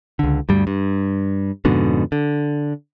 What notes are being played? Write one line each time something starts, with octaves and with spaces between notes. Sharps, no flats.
C#2 D3
D2 G2 G3
G2
F2 G#2 B2 D3
D3